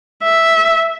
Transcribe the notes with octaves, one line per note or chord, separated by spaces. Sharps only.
E5